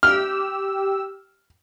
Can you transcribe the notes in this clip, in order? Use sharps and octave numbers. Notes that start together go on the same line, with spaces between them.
G4 E6 F6